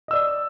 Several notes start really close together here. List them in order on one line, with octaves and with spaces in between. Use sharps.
D#5 E6 D5